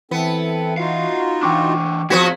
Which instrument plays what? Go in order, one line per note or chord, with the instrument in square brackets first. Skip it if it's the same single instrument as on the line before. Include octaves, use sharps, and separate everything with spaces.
[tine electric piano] E3 [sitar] B3 [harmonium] C4 E4 A4
[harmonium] D#4 F4 F#4 [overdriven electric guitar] E5 F5
[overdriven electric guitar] E3 D4 [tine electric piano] G5 C#6 D6
[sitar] F3 B3 F#4 [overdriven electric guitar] C4 G#4 [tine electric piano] G#6 B6